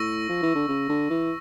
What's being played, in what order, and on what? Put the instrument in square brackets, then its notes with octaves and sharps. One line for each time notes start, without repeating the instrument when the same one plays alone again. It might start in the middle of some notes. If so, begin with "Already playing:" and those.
Already playing: [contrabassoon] A2 [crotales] C#6 E6 A#6
[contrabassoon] F3
E3
D3
C#3
D3
E3